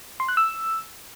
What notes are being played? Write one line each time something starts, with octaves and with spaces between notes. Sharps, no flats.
C6
F#6
E6